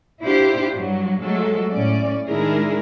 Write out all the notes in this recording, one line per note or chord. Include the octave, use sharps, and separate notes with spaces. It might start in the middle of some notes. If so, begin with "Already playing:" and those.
D4 E4 F4 G4 C5
G2 F#3
F#3 G#3 A3 A4
A2 C#4 D5
D#3 G#3 D4 E4 G#4 A#4